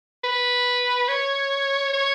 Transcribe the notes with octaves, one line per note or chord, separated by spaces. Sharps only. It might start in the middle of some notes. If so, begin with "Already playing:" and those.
B4
C#5
C#5